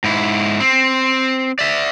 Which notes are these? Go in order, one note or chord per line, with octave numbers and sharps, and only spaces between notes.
G#2 E4
C4
D5 E5